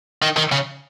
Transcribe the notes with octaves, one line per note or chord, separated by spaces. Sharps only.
D#3
D#3
C#3